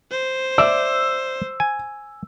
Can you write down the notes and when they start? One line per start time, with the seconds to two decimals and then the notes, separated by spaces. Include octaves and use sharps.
0.11 C5
0.58 D5 E5 E6
1.60 G#5